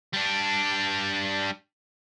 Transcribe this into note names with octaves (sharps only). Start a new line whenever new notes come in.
G3 D4